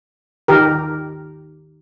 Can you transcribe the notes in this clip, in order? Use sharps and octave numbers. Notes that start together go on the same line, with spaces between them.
D#3 G4 A#4